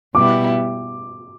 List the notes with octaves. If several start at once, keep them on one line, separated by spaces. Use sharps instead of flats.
B2 G3 B3 E4 G4 D6